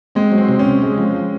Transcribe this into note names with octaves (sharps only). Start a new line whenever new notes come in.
G#3 C4
F#3
C4
C3
C#4
C3
G#3
F3